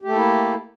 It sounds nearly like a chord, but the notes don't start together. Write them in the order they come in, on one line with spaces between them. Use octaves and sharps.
G4 A3 A4 A#3 E4